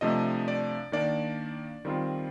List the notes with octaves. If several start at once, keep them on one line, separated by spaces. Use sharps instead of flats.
C3 F3 A3 D4 D#5
D5
D#3 A#3 D4 D5
D#3 G3 C4 F4